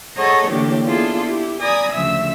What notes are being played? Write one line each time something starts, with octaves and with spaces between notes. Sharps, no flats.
G#4 A4 C#5 D#5 F#5 A#5
A2 D3 E3 A#3 D4 G4
B3 D4 E4 F4 G#4 A4
E4 G4
D5 G#5 A#5 B5 D#6
D2 C#3 F3 E5 E6